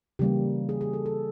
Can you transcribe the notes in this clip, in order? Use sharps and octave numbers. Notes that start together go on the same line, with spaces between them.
C#3 E3 G3 A#3 G4
G#4
G#4
A4
A4